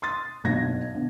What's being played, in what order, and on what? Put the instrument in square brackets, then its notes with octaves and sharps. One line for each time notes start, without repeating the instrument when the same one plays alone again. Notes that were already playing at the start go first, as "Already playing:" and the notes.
[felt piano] C6 D#6 A6
F#1 B1 D3 F#3 G#6 A#6
B2 D3